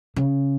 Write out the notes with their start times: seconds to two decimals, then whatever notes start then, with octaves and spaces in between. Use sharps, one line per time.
0.16 C#3